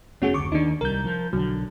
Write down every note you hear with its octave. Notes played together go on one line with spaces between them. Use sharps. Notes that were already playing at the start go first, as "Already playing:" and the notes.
F1 A3 B3 C#4 F#4 G#4
F#1 D2 C#6 D6
D#2 D#3 D4 D#4
C2 G3 A#4 G6
F3
B1 D3 F#3